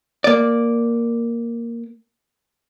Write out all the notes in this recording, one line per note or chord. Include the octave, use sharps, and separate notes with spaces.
A#3 D5